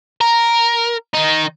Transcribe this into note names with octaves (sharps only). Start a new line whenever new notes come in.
A#4
D#3 D#4